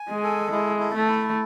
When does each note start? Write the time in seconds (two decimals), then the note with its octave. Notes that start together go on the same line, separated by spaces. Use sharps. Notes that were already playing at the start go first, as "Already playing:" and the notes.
Already playing: G#5
0.09 G#3
0.23 A4
0.51 G#3 E4
0.80 A4
0.94 A3
1.09 E4